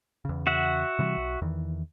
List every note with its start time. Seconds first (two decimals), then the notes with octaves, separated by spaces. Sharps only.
0.25 E2 C#3
0.47 F#4 E5 F#5
0.99 C3 E3 G3
1.17 B1
1.41 E2 D#3 E3